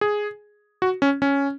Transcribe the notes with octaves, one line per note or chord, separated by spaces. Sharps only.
G#4
F#4
C#4
C#4